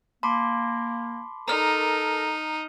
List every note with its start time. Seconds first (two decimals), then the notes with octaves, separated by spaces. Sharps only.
0.23 A#3 A5 B5 C6 D6
1.48 D#4 A4 A#4 A#5 F6